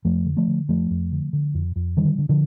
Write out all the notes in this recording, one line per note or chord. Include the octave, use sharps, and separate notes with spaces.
F2 F3 A3
D3
F3 A3
D3
F2 F3 A3
F2
D3
D3
F2
F2
D3 D#3 G3
D3
D3 F3